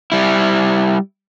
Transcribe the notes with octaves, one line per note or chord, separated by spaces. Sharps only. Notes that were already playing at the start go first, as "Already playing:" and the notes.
G3 E4